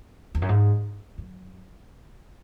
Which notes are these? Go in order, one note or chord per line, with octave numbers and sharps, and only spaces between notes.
E2
F#2
G#2
F#2